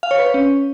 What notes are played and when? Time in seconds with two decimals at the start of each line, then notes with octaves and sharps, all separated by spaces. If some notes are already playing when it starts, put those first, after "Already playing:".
0.03 F5
0.11 C#5
0.19 B4
0.26 C#5
0.34 C#4